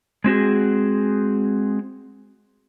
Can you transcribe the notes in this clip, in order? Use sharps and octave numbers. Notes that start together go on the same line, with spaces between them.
G#3 C4 F#4 G#4